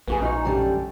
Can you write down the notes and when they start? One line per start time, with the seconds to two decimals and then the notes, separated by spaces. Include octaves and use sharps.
0.07 A#1 B3 F#4 G#4
0.22 D#4 F#4
0.45 F#2 D3 G3